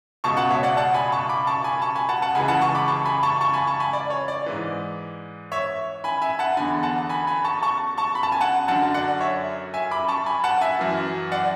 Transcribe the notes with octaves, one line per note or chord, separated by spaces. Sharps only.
C#2 B2 A5 C#6
F#5 A5
C#5 E5
D5 F#5
F#5 A5
G#5 B5
A5 C#6
B5 D6
A5 C#6
G#5 B5
A5 C#6
G#5 B5
F#5 A5
F#5 A5
C#2 C#3 E3 G#5 B5
F#5 A5
A5 C#6
B5 D6
A5 C#6
G#5 B5
A5 C#6
A5 C#6
G#5 B5
A5 C#6
G#5 B5
D5
C#5
D5
G#2 E3
C#5 E5
G#5 B5
E5 G#5
F#5 A5
E2 D3 G#5 B5
F#5 A5
G#5 B5
G#5 B5
A5 C#6
A5 C#6
A5 C#6
B5
A5
G#5
F#5 A5
F#2 D3 F#5 A5
D5 F#5
C#5 E5
E5 G#5
B5 D6
A5 C#6
G#5 B5
F#5 A5
E5 G#5
F#2 E3
D5 F#5